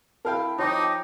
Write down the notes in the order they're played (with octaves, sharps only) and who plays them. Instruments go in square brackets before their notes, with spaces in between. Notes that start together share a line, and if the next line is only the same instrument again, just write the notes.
[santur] E4 A5 [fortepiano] A#4 F5 G5
[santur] F3 G5 D6 [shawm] D#4 [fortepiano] C#5
[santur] G5 D#6